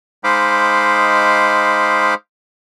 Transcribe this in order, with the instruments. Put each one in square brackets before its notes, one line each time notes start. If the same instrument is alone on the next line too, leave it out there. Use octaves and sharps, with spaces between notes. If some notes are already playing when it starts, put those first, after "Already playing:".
[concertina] G#3 D#4 C5 F5 B5 D6